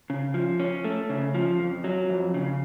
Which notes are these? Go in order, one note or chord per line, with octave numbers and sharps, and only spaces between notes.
C#3
F3
C#4
A3
C#3
F3
F2
F#3
F2
C#3